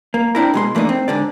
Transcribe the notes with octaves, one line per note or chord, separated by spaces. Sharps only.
A#3
C4 D4 E4 A#4
B2 G#3 C6
E3 A3 A#3 D4 D#4
C4
G#2 D3 D5